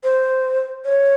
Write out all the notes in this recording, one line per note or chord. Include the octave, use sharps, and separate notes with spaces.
C5
C#5